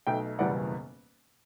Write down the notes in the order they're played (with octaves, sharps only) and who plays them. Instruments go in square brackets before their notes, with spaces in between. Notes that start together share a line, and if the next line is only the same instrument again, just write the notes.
[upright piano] B1 B2 A3 E5 G5
F#1 E2 B2 G3 B3 D5 F#5